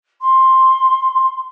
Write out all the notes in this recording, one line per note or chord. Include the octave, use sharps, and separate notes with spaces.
C6